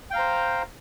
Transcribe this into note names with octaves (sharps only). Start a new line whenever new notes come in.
C5 F5 G5 A#5